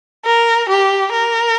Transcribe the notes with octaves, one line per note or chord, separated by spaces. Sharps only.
A#4
G4
A#4